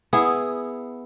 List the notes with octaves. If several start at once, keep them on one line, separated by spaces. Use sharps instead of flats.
B3 E4 G#4